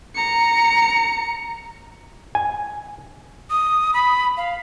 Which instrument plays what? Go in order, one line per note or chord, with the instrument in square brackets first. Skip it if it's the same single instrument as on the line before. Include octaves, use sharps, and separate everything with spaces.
[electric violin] A#5 C#7
[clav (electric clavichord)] G#5
[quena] D#6
B5
F5